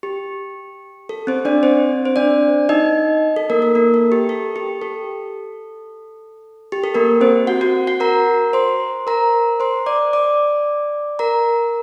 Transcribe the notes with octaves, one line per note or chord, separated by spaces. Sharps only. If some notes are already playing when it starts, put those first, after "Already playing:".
G4
A4
C4 C5
D4 D5
C4 C5
C5
D4 D5
D#4 D#5
A4
A#3 A#4
A4
A#3 A#4
A4
G4
A4
G4
A4
G4
A4
A#3 A#4
C4 C5
F#4 F#5
F#4 F#5
F#4 F#5
A#4 A#5
C5 C6
A#4 A#5
C5 C6
D5 D6
D5 D6
A#4 A#5